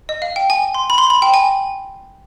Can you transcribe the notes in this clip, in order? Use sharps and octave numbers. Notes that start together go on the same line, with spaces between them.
D#5
F5
G5
G#5
C6
B5
C6
B5
G5
G#5